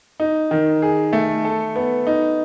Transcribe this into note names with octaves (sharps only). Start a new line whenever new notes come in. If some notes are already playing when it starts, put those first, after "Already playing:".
D#4
D#3
G#4
A3
A4
B3
D#4